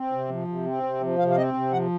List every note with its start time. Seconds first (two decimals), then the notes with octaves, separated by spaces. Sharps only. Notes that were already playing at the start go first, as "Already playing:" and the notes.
Already playing: C4
0.12 C3
0.29 F3
0.48 C3
0.66 C4
0.83 C3
1.01 F3
1.18 C3 F5
1.30 F5
1.36 C4 D#5
1.54 C3
1.72 F3 F#5